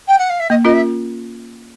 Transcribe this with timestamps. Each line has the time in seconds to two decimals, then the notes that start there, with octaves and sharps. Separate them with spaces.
0.08 G5
0.18 F#5
0.30 F5
0.40 E5
0.50 A#3 D#5
0.65 C#4 F4 A#4 D#5
0.73 E5